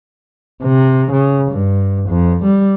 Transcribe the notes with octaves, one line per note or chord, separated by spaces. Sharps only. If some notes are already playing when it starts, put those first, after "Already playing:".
C3
C#3
G2
F2
G3